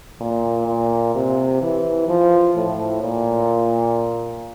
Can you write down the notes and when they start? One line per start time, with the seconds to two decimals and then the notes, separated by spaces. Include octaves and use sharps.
0.20 A#2
0.67 A#2
1.15 C3
1.62 E3
2.09 F3
2.56 A2
3.03 A#2